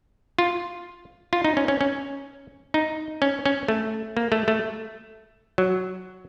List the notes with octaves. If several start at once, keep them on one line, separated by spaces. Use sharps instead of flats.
F4
F4
D#4
C#4
C#4
C#4
D#4
C#4
C#4
A3
A#3
A3
A3
F#3